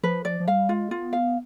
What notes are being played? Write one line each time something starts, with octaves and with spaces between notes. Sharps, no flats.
F3 B4
F3 D5
F3
G3 F5
G#3 F4
B3 F4
F5